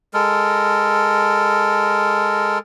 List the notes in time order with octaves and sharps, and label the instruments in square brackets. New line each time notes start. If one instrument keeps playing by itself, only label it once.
[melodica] G#3 A4 A#4